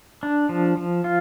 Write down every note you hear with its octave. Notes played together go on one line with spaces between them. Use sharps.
D4
F3
F3
F4